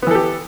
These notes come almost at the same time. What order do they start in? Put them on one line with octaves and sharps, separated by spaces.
B3 E3 A4 G4